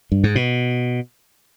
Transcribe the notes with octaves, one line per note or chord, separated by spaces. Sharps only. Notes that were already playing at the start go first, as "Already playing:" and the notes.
G2
G#2
B2